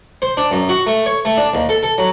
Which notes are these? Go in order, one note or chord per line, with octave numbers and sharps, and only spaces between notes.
C5
D4
F#2
F#4
A3
C#5
A3
D4
D#2
A4
A4
F#3